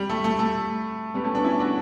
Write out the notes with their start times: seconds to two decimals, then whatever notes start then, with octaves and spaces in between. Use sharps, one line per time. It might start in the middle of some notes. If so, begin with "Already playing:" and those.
Already playing: G3
0.09 A3
0.24 A3
0.39 A3
1.14 G3 B3
1.24 A3 C#4
1.35 B3 D4
1.44 C#4 E4
1.59 D4 F#4